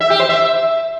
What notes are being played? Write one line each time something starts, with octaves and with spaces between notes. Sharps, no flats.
E5
G4
C5
E5